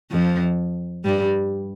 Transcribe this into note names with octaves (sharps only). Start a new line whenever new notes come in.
F2 F3
G2 G3